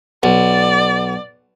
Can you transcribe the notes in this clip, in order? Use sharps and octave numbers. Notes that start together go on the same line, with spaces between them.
B1 D5